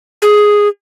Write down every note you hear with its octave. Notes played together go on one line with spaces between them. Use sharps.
G#4